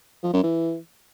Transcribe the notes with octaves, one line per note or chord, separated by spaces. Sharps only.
F3
F#2
E3